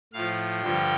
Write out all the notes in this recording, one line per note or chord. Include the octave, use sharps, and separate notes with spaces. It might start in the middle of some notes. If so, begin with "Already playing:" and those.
A2 F3 F5
G2 D3 F3 G5